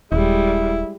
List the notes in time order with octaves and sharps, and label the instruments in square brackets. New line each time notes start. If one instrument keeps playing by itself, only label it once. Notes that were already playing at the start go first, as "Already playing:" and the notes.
[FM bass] D#1 [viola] G3 G#3 [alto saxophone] E4